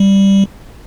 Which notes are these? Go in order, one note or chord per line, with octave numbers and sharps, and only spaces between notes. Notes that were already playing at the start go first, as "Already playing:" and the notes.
Already playing: G3